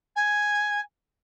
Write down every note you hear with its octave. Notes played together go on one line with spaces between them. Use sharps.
G#5